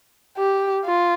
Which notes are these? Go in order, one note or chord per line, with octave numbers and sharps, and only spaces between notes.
G4
F4